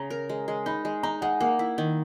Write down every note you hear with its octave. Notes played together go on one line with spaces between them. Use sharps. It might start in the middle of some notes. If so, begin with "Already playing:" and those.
Already playing: C#3 A#5
A#4
G#3
G#3
D#4 B5
G#3
D#4 A#5
G#3 F#5
A#3 F#5
E4
D#3